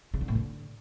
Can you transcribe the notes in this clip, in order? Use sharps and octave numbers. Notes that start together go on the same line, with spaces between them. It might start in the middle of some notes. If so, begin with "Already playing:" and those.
C#3
D3
A2
D3